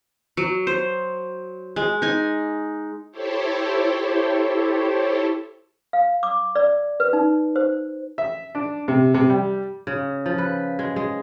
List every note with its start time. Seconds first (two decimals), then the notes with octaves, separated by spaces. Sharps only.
0.37 F#3
0.67 C5
1.76 G#3
2.02 D#4 G#5
3.12 E4 G4 A4 C5 C#5
5.93 F5
6.23 D6
6.56 D5
7.00 B4
7.13 D#4
7.56 C5
8.18 E5
8.55 D4
8.88 C3
9.14 C3
9.30 G3
9.87 C#3
10.26 F3
10.38 B4
10.79 G#3
10.96 G#3